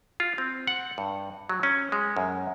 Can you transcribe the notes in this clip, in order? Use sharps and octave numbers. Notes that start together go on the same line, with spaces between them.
F4
C4
F#5
G2
F#3
C#4
G#3
F#2